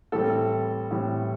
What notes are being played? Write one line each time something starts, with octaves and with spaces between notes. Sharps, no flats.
A2 E3 G3 C4 A4
A2 E3 G3 C4